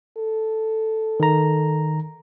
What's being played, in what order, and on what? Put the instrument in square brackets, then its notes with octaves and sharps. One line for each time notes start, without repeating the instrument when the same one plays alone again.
[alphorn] A4
[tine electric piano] D#3 A#5